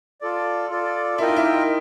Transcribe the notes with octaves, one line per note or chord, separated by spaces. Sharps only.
F4 A4 D5
F4 A4 D5
E4 F4 A#4 D#5 G5
D#4
E4